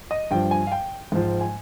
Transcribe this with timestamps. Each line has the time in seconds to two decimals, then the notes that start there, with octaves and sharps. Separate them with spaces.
0.11 D#5
0.31 G2 F3 G5
0.51 G#5
0.67 F5
0.72 G5
1.12 G#2 F3
1.41 G#5